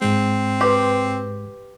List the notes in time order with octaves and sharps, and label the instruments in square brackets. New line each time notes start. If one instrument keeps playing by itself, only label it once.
[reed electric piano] G#2 G#3 [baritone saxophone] C4
[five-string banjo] G4 [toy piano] B4 C6